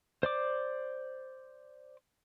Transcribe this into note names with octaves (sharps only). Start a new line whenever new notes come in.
C5 D5 D6